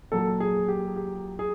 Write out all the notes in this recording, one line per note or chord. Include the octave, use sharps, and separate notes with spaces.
A#2 F#3 A4
G#4
G4
G4
G#4